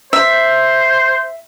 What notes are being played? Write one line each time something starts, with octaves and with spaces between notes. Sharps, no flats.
C5 E5